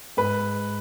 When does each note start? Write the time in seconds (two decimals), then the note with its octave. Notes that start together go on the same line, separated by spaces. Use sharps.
0.17 G#2 B4